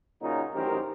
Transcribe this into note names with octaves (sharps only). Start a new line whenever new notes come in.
A#2 C#3 F#3 D#4
A1 F#2 D#3 G4 A#4 C5